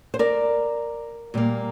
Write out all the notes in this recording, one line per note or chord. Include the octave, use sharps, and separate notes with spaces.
C5
A#4 D5
A#2 G3 A#3